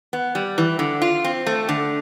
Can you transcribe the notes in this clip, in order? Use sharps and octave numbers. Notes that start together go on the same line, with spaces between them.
B3
G3
E3
D3
F4
C4
A3
D3